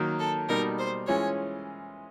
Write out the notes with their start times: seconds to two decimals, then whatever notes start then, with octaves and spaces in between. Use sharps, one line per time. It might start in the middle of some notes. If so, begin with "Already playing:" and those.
Already playing: D#3 F#3 A#3
0.19 A4
0.49 B2 G3 A#3 D#4 A#4
0.79 C5
1.07 E3 G#3 C#4 F4 C#5